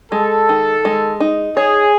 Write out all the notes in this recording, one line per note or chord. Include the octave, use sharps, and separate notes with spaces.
G#3 A4
D#3
G#3
D#4
G#4 C#5